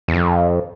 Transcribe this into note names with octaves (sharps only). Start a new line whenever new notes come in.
E2
F2